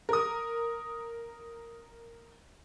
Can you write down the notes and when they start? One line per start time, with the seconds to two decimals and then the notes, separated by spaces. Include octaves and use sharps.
0.09 A#4 D#6